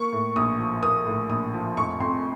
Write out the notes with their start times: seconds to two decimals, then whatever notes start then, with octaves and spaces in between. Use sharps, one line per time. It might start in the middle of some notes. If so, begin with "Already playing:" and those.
Already playing: A#3 C#6
0.12 A2
0.36 A#1 D#6
0.59 F3
0.83 A#3 D#6
1.06 A2
1.30 A#1 D#6
1.54 F3
1.77 F1 C#6
2.00 F2 C6